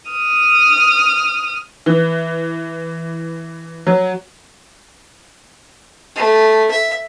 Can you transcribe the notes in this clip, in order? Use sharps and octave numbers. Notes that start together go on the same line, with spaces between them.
D#6 F6
E3
F#3
A3
E5